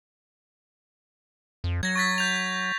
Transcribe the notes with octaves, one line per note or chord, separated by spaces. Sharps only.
F2
F#3 G#6 A#6
C#6 A6 B6
G6 F7